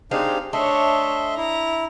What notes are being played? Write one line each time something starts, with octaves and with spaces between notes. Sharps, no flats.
G#3 C4 D4 D#4 G4 F5
A3 D4 C#5 D#5 E5 C6
E4 A#5